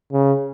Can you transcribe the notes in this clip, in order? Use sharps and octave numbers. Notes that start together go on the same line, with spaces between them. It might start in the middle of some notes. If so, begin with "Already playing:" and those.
C#3